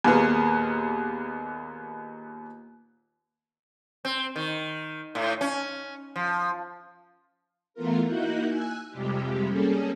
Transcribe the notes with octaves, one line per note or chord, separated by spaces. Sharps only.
D#2 A#2 A#3 B3 G#4
C4
D#3
A2
C#4
F3
E3 A3 B3 F4 A#4
A#3 D#4 E4 F#4 F#6 G6
G#5 E6 F#6
F2 C3 G3 G#3 G4
G3 A#3 C#4 G#4 A4